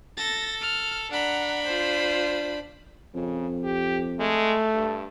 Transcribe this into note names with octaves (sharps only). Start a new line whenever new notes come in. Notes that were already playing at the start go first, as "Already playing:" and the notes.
A4 A6 A#6
F6
D4 F#5 A#5 B5
F4 C5
F2 C#3
G4
G#3 A3
G2